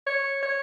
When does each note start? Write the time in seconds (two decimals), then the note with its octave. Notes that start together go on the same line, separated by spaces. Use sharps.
0.07 C#5
0.43 C#5